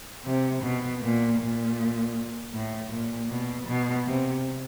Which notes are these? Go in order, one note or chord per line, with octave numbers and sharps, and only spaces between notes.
C3
B2
A#2
A#2
A2
A#2
B2
B2
C3